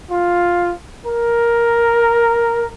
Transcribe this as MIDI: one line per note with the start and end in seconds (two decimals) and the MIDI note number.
0.11 0.71 65
1.06 2.68 70